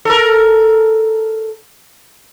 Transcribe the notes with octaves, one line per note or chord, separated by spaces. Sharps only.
A4 A#4